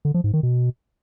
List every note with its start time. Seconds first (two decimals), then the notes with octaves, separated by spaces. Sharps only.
0.05 D3
0.14 F3
0.24 G#2
0.34 D#3
0.43 B2